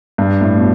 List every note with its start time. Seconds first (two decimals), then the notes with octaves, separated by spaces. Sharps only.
0.18 G2
0.41 A2
0.57 B2